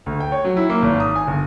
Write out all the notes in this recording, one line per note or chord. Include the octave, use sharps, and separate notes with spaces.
D2
G5
C#5
F#3
E4
A#3
G#1
D#6
G#5
G1